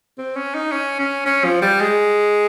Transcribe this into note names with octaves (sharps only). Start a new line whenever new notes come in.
C4
C#4
D#4
C#4
C#4
C#4
F3
G3
G#3